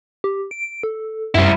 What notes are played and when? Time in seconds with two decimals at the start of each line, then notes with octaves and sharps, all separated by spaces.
0.24 G4
0.51 D7
0.83 A4
1.35 F#2 G3 E4